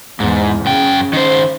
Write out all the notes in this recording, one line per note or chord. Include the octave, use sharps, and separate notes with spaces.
E2 G#2
F#2 C#3 G5
D#3 C5